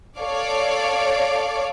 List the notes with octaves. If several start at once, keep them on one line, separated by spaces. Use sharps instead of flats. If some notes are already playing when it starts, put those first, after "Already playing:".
A4 C#5 D5 F5 D6